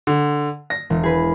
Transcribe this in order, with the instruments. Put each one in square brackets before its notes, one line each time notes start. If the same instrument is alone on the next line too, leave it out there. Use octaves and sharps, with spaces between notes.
[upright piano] D3
A#6
[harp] E1
G#4 B4